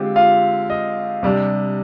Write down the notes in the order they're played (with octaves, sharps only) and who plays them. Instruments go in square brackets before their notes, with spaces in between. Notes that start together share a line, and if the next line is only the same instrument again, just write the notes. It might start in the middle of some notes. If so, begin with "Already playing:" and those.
Already playing: [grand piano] D3 G#3 C4 F4 G4
F4 F5
D#5
C3 G3 D4